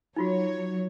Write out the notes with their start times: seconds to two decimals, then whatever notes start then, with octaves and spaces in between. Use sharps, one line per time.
0.16 F#3 D#4 F4 F#4 C#5